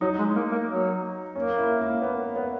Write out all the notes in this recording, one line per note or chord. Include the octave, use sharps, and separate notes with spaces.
F#3 D#4
G#3
A#3
A#3
F#3
A#3 C#4
E4
A#3
B3
B3